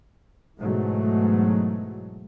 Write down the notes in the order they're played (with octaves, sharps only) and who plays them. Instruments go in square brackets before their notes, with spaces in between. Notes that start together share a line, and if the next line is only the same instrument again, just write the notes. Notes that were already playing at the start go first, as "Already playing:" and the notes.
[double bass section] G#2 B2 E3 F#3 G#3 A3